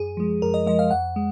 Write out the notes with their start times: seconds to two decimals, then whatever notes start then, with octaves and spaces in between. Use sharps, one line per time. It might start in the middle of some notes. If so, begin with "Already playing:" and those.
Already playing: F#2 G#4
0.17 F3 G#3
0.42 F#2 A#4
0.54 D#5
0.66 F3 G#3 D#5
0.79 F5
0.91 F2 F#5
1.16 G#3